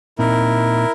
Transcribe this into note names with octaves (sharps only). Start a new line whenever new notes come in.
A#2 C4 D#4 E4 A#4